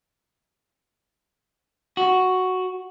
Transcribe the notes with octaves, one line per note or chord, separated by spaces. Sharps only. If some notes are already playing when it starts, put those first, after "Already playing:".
F#4